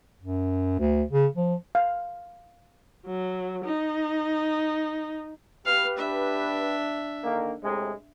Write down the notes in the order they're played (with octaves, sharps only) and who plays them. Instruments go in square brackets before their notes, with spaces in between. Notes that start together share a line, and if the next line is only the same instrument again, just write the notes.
[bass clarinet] F#2
D2
C#3
F3
[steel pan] F5
[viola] F#3
D#4
[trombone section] G4 B4 [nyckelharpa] F5
[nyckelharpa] D4 E5
[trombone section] D3 D#3 A#3
A2 C3 G#3